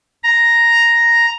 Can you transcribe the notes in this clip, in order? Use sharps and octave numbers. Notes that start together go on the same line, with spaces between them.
A#5